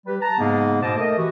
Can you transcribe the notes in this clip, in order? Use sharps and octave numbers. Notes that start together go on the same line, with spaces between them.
G3 G4 B4
A5 A#5
G#2 C#3 G#3 A#3 B3
G#2 B2 C5 D#5 A5 D6
A3 A4 A#4 D#5
E3 F#4 G4